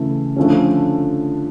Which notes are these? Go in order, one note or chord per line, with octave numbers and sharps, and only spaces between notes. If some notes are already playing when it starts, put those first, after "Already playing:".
Already playing: C#3 E3 A3
D3 F3 A3 C#4